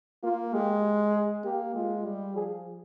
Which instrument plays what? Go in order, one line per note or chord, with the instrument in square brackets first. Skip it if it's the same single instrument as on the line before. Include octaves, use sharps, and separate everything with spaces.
[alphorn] A#3 [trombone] F4
[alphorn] G#3 [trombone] G4
[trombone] G#4
[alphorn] A#3 [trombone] G4
[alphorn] G#3 [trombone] F4
[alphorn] G3
[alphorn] F3 [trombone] G#4